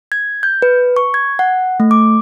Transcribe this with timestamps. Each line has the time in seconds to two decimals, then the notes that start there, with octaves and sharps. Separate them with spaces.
0.12 G#6
0.43 G6
0.62 B4
0.97 C#6
1.14 G#6
1.39 F#5
1.80 A3
1.91 D6